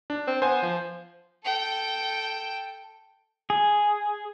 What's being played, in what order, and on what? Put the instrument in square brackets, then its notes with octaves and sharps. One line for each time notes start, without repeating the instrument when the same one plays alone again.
[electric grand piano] D4
[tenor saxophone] C4
[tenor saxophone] B3 [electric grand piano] C5 G#5
[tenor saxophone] F3
[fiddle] A4 G5
[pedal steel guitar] G#4